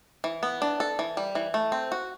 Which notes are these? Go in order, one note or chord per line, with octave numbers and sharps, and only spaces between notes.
E3
B3
D4
A4
E3
G3
E3
A3
C4
F#4